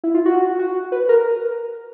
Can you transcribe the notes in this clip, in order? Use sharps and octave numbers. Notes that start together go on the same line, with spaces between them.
E4
F4
F#4
F#4
B4
A#4